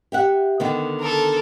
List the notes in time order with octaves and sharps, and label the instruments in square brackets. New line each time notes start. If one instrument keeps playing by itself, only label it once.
[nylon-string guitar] G4 E5 F#5
D3 D#3 B3
[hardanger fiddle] A4 A#4